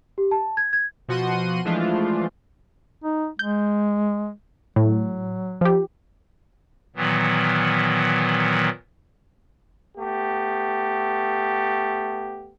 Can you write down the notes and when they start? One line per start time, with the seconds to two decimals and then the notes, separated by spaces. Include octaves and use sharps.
0.18 G4
0.31 A5
0.57 G#6
0.73 G#6
1.08 B2 F3 F#4 F#5 C6 D#7
1.65 E3 F3 G#3 A3 D4 F4
3.04 D#4
3.39 G#3 G6
4.76 A2 F#3
5.61 F3 G4
6.96 A#2 D#3 E3 F#3 B3
9.98 A3 B3 G4